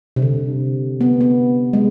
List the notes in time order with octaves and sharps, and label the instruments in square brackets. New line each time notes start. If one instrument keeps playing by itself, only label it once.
[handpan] C3
D3
B3
B3
G#3